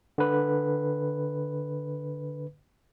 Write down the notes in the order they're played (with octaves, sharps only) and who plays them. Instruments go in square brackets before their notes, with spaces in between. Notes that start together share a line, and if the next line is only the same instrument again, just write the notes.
[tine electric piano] D3 B4